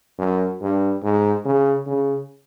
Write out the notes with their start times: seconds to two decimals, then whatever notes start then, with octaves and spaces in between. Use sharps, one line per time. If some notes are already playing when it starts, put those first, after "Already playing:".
0.19 F#2
0.61 G2
1.03 G#2
1.45 C#3
1.87 C#3